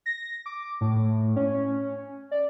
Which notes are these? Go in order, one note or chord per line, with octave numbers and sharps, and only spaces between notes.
A#6
D6
A2
C#4
D5